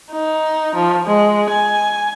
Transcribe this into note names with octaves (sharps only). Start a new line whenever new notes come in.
D#4
F3
G#3
G#5